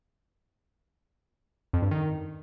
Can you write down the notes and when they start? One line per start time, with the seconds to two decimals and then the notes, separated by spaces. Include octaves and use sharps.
1.73 F2
1.82 G2
1.91 D#3